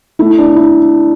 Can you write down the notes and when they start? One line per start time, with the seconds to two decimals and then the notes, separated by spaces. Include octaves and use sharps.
0.19 A3 E4
0.38 D4
0.56 E4